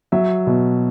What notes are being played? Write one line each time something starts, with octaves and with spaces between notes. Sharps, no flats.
F#3 E5
B2